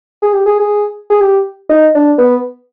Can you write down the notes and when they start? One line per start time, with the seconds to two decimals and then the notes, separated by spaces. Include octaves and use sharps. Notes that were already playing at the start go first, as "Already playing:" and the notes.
0.22 G#4
0.34 G4
0.46 G#4
0.60 G#4
1.10 G#4
1.21 G4
1.69 D#4
1.95 D4
2.18 B3